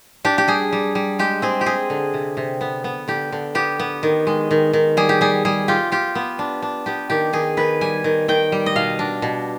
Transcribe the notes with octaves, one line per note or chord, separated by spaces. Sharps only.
D4 G4
G4
G3 G#4
G3
G3
G#3 G4
C4 G#4
G4
C4 G#4
D3
C3
C3
B3
B3
D3 G4
D3
B3 G4
B3
D#3
G#3
D#3
D#3
G3 G#4
G4
G3 G#4
G3 G#4
F4 G4
F4 G4
B3
D4
D4
B3 G4
D#3 G4
D#3 G#4
D#3 B4
G3 G#5
D#3
D#3 G5
G3
D#5
B2 F5
D4
B2